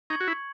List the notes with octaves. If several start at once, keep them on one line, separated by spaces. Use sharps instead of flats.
D#4 C#6 G#6 C#7 F#7
F#4
E4